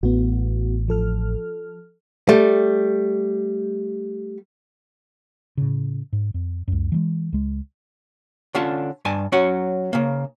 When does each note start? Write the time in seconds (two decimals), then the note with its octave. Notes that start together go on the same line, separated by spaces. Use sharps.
0.03 A1 B3 F#4
0.88 F3 A4 F6
2.29 G3 A3
5.57 A2 C#3
6.13 G#2
6.34 F2
6.68 C#2 F#2
6.92 E3 G3 G#3
7.33 C#2 G#3
8.55 D3 C#4 F4 A5
9.05 G2 G#5 A5
9.32 F#3 C#4 F#4 F#5
9.93 C#3 A#3